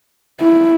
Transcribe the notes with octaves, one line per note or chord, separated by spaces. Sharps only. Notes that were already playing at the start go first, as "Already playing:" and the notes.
E4